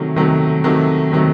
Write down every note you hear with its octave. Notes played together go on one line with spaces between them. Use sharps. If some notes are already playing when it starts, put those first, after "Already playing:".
Already playing: C3 D#3 F#3 A3
C3 D#3 F#3 A3
C3 D#3 F#3 A3
C3 D#3 F#3 A3